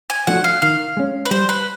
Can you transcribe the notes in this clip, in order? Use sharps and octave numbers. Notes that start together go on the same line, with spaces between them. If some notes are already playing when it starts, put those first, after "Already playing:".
G#5
F3 A3 D4 F#4 F#5
F5
D#3 F5
G#3 C#4
B4
G3 C5
B4